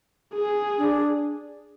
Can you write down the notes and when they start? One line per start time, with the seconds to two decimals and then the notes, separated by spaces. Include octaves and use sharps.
0.34 G#4
0.78 D4